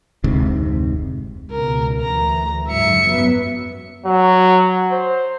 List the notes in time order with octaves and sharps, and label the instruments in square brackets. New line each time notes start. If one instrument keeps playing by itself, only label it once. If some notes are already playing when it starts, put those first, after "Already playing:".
[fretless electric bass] F1 D2 G#2 C3
[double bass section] C#2 B2 [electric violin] A#4
[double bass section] D2 E3 [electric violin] A#5
[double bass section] F#1 G#2 F#3 [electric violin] E5 C#7
[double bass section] F#2 F#3 B3
[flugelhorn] F#3
C5